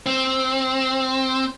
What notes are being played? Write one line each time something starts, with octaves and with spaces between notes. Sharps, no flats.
C4